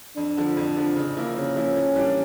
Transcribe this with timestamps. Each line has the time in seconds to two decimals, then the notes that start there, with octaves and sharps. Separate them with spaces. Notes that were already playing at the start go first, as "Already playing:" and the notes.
0.17 F2 D4
0.37 D3 F3
0.57 F2
0.77 D3 F3
0.96 C#3
1.17 F3 A#3 E4
1.37 C#3 C#4
1.56 F3 A#3 E4
1.76 A2
1.96 E3 G3 A#3 D4